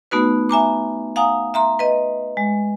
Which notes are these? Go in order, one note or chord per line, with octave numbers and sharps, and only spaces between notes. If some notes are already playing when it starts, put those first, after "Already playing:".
A3 B3 D#4 F#4 B4
E5 G#5 A#5 D6
F5 F#5 G#5 A#5 D#6
E5 A#5 C6
B4 D#5
G#3